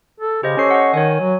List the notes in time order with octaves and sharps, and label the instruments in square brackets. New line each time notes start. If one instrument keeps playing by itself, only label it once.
[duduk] A4
[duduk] C#3 [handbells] G4 C5 D#5
[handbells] C#4 A4 C7 [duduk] C#5
[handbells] D#5 F#5
[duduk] D#3 [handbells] C#5 G#5
[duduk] F#3